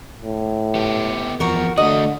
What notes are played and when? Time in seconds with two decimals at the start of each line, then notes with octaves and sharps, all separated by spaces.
0.22 A2
0.75 B3 G4
1.40 E2 F3 F#4 A#4
1.78 D3 A3 F#4 D#5